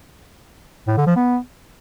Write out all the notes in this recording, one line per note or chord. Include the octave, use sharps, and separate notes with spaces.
A2
D3
F3
B3